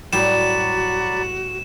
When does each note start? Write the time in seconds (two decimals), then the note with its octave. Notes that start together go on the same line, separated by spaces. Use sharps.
0.13 A2 F#3 G3 F#4 D5 B5 E7